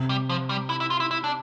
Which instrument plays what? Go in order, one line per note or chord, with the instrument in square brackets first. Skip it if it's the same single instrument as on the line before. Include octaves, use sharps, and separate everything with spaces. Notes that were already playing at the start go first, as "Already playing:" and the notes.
Already playing: [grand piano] C3
[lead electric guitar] G3
F3
G3
E4
E4
F4
E4
E4
D4